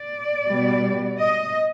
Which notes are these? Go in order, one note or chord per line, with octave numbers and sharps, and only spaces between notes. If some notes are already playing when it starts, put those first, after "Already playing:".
Already playing: D5
B2 G3
D#5